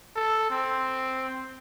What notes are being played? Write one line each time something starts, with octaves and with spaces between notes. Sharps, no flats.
A4
C4